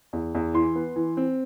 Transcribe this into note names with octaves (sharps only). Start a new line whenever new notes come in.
E2
E2
E3 C6
B3
E3
C4